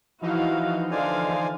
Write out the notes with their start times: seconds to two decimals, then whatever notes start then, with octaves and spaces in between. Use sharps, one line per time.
0.22 E3 F3 D#4 E4 F#4 F5
0.91 D3 C5 D5 F5 G#5